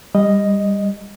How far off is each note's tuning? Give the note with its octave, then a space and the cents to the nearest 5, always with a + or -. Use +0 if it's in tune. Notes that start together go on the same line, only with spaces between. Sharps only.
G3 +20 D#5 +0